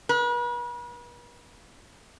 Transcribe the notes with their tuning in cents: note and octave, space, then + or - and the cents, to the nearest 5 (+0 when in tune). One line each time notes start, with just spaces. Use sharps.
B4 -40